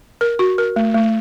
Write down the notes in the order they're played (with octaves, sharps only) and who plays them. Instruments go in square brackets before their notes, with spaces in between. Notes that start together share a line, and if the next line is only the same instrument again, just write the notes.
[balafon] A#4
F#4
A#4
A3
A3